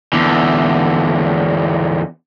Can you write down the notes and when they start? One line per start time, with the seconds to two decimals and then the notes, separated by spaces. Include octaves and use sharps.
0.13 E2 D3